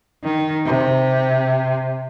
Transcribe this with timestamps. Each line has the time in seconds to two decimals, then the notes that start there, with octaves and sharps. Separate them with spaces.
0.23 D#3
0.66 C3